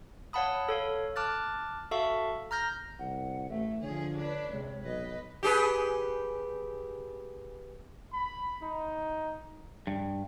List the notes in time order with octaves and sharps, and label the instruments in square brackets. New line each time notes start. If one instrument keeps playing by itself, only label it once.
[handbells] C#5 F5 F#5 A5 B5 D#6
A4 C#5 F5
A5 D6 F6 F#6 A6
F#4 A4 E5 F5 A5 C#6
A#5 F6 G6 A#6
[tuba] C2 [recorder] F#5
[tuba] A1 [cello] A3 [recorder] E5
[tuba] D3 [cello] F3 G#4 [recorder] C#5
[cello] D4 B4
[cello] C3 [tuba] G#3
[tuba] B1 [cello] B4 D#5
[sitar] G4 G#4 B4
[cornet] B5
D#4
[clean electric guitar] G2